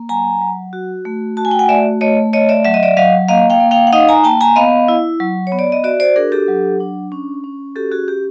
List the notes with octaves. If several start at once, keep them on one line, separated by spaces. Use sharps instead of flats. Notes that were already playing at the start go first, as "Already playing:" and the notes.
Already playing: A#3
F#3 G#5 A#5
F#3
F#4
A3
F#4 A5
G#5
G5
F#5 G#5
A3 D5 E5
A3 C#5 D#5
A3 C#5 D#5
D5 E5
F#3 E5
D#5
D5 E5
F#3 D#5 F5
A#3 D#5 F5
F5 G5
A#3
F5 G5
F#5
D#4 D#5 F5
G#5 A#5
A#3 G5 A5
G#5 A#5
B3 D#5 F5
E4
F#3
C#5
B3
D5
D#5
F#4 D5 E5
C5 D5
D4 G#4 A#4
G4 A4
F#3
D4
C#4
C#4
F#4 G4 A4
F#4 G#4
C#4 G4